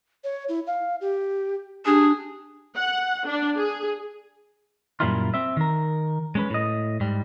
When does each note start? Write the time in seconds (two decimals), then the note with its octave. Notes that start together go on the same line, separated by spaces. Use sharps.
0.24 C#5
0.49 E4
0.67 F5
1.01 G4
1.86 D4 G4 G#4
2.76 F#5
3.26 D4
3.57 G#4
5.00 F#2 A#2 G3 A#3 E4 F4
5.34 C4 E5
5.57 D#3 A#4
6.35 G#3 C#4 B4
6.50 A2 D#5
7.00 G#2 G3